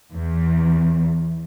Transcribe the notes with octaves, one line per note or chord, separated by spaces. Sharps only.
E2